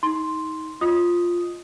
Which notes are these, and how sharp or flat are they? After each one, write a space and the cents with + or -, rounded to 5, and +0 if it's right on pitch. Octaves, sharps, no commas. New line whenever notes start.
D#4 +25 C6 +0
F4 +0 D#5 +0 D#6 +0